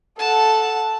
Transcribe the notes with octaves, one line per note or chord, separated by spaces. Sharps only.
A4 F#5 A5